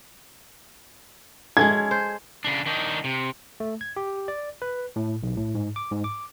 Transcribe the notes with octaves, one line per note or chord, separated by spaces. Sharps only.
G#3 C#4 A4 G#6
C5
C#3 D4
D#3 D4 D#4
C3
A3
G#6
G4
D5
B4
A2
B1
A2
G#2
D6
G#2
D6